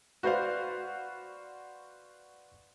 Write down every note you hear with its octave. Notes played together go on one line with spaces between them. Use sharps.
F#4 B4 C5 D5 F5